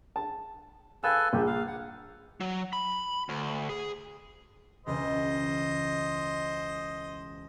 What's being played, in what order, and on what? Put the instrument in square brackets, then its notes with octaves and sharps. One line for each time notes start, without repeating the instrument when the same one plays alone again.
[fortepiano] A5
[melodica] A4 B4 G#5 [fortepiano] F5 E6
[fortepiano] A#1 F3 G#4 [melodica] G4
[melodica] F5
F#5
[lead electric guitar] F#3
B5
D2
G#4
[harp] E1 C#2 [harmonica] C5 D#5